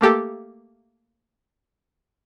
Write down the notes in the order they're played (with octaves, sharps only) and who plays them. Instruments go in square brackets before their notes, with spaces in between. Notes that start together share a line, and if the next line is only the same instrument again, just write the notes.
[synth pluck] A3 A#3 G4 A4